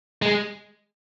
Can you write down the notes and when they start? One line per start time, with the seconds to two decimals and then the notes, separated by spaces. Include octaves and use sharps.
0.22 G#3